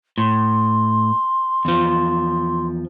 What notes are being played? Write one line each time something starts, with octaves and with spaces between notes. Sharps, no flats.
A2 C6
E2 F3